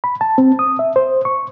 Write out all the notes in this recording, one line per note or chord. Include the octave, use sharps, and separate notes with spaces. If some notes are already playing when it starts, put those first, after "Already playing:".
B5
A5
C4
D#6
E5
C5
C#6